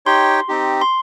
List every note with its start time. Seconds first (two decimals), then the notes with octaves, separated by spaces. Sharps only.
0.06 D#4 G4 C#5 G5 C6
0.49 C4 D#4 G4
0.81 C6